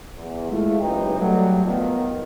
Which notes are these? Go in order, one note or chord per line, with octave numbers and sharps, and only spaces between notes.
E2
G#3 A3 E4 F4
F#1 C#2 D#4 G4 B4 G5
F#3 G3 A3
F#1 D#3 B3 F4